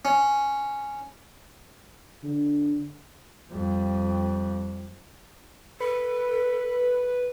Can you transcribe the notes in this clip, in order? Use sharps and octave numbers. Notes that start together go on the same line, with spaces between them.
C#4
D3
F2 G3
A4 B4